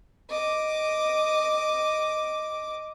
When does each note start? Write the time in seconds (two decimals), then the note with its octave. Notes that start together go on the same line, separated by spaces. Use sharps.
0.30 D#5 D6